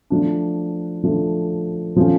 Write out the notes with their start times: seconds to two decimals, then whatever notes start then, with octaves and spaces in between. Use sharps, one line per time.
0.10 F3 A3 D4
1.04 F3 A3 D4
1.96 F3 A3 C#4 F4